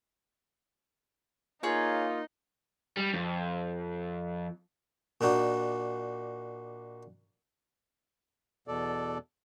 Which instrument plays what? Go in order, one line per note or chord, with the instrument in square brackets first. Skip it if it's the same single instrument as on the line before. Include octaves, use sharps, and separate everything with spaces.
[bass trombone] A#3 [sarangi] D#4 [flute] F4 [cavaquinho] G#4 C#5 F5
[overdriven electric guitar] G3
F2
[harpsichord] A#2 D4 D#4 F#4
[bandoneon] E2 B2 A4 D5